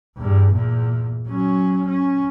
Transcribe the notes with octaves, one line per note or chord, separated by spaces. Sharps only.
E2 G2
E2 A#2
F#3 C#4
C#4